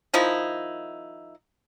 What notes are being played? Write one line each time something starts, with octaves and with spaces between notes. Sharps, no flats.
D#3 F3 D#4 E4